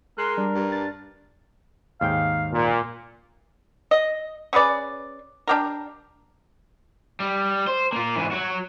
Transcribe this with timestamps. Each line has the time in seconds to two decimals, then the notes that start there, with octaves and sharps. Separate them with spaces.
0.18 G#3 A#4 C6 F#6
0.37 G3 D4
0.54 G2
0.72 D4 A6
2.01 D#2 G#2 F5 G5
2.53 A#2
3.91 D#5
4.53 C#4 G#4 B4 D5
5.48 D4 G4 A#4
7.20 G3
7.67 C5
7.92 A#3 F4
8.16 G#2 E3
8.31 F#3 F#4